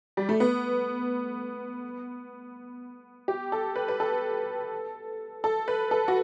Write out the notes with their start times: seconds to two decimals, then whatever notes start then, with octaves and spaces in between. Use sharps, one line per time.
0.17 G3
0.29 A3
0.40 B3
3.28 G4
3.52 A4
3.76 B4
3.88 B4
4.00 A4
5.44 A4
5.68 B4
5.91 A4
6.08 F#4